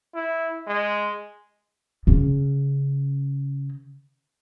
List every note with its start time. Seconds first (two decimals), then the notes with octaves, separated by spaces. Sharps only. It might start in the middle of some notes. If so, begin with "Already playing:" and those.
0.15 E4
0.67 G#3
2.07 C#3 C#4